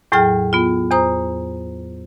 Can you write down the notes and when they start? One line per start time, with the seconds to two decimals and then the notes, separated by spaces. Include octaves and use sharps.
0.12 E2 A2 F#3 G#4 G5 F6
0.53 B3 F4
0.91 E2 C5 A#5 D#6